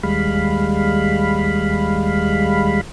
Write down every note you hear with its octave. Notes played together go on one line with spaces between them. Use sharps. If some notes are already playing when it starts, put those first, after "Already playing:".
D#2 G3 G#3 F5 B5